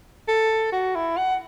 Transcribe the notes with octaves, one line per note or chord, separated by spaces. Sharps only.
A4
F#4
E4
F#5